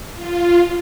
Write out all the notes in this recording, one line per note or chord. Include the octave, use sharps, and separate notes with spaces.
F4